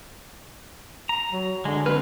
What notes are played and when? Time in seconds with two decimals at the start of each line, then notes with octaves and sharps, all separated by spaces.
1.09 A#5
1.33 F#3
1.65 D3 G#3
1.86 C4 B4 F6